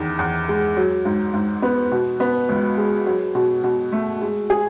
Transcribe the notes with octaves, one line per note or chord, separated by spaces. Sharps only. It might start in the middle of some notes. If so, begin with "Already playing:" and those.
Already playing: E2 D#3
E2
G#3
F#3
G#2
G#2
B3
B2
B3
C#2
G#3
F#3
B2
B2
A3
G#3
G#4